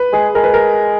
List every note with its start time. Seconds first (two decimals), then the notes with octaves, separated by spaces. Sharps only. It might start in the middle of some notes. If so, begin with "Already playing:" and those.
Already playing: B4
0.13 G#3 G#4
0.35 G#3 A#4
0.44 B4
0.54 A#4